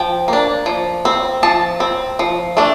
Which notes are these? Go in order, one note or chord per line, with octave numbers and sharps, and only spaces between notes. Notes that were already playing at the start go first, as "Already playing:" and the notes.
Already playing: F3 G5
A#3 D4
F3
C4
F3 A5
C4
F3
A3 D4